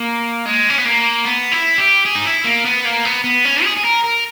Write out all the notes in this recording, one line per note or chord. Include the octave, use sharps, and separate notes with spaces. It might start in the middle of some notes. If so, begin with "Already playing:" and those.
Already playing: A#3
G#3
C#4
B3
A#3
B3
E4
G4
G#4
D#4
E4
A#3
B3
A#3
B3
B3
C#4
G#4
G#4
A#4
A#4